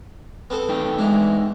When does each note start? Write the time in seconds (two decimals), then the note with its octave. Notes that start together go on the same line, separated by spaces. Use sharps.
0.50 B3 C4 A4
0.69 A3 D#4 G5
0.98 G#2 E3 G#3 D4